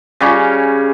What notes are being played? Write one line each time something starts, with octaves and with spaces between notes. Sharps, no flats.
C#3 G3 C#4